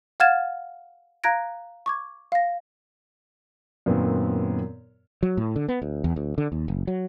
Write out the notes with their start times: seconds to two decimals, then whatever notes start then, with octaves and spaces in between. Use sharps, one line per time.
0.20 F5 F#5 F6 G#6 A6 E7
1.24 F5 A#5 F#6 G#6 A#6 D7
1.86 C#6 D6 G#6
2.32 F5 A#6
3.86 F#2 A#2 D#3 B3 C4
5.23 F#3
5.37 A2
5.56 D3
5.68 B3
5.82 D2
6.04 E2
6.16 D2
6.38 D3
6.52 D#2
6.68 F#1
6.87 F#3